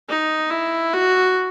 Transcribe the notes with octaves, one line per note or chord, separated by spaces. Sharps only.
D#4
E4
F#4